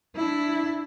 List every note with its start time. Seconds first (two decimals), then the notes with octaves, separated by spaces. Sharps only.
0.16 D4 E4